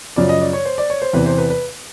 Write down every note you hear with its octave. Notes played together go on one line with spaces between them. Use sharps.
F#2 C#3 F3 D5
D#5
D5
C#5
C5
D5
C#5
C5
E2 C3 E3 B4
C5
B4
B4